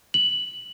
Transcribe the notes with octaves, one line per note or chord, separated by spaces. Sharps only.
F#7